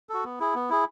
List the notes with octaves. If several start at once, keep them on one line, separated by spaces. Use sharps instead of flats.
F#4 A4
B3
E4 G#4
B3
E4 G#4